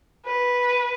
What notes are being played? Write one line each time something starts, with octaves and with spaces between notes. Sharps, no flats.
B4